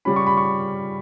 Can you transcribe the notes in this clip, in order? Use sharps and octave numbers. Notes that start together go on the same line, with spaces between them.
C#3 G3 C#4 B5
C#6
B5
C#6